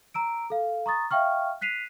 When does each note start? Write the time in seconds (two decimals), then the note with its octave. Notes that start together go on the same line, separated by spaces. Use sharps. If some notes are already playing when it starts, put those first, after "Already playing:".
0.14 A#5 E6 D7
0.50 A4 F5
0.86 A#5 C#6 D#6 A6
1.11 E5 F5 G5 C#6 F6
1.61 F#6 B6 C7 D#7 F7